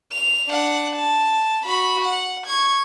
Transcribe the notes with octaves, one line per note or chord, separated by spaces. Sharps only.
F7
D4 F#5
A5
F#4 B5
F#5
C#6 G#6